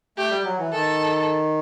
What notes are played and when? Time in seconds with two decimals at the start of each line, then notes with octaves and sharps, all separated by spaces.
0.17 A3 G4
0.30 G3
0.44 F#3
0.58 E3
0.73 D#3 A4